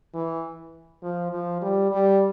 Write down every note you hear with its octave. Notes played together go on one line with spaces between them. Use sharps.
E3
F3
F3
G3
G3